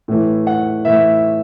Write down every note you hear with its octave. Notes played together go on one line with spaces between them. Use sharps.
A2 E3
F#5
A2 E3 E5